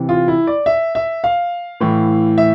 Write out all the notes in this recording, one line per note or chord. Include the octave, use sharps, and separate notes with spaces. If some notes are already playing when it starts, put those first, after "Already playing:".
Already playing: C3 E3
F4
E4
D5
E5
E5
F5
A2 E3
E5